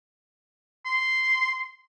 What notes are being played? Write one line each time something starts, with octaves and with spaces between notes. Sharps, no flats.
C6